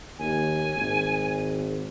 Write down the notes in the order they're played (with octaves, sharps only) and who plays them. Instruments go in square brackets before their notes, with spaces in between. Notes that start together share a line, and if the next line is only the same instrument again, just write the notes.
[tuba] D#2 [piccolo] G#5
[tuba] G#1